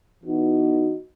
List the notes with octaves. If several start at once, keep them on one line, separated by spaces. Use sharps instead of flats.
E3 B3 D#4 F#4